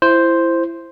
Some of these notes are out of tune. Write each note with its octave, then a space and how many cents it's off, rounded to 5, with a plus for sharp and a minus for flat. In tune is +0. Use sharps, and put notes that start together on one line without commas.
E4 +20 C5 +0